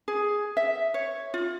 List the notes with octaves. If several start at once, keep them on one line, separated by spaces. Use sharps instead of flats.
G#4
E5
C#5
F4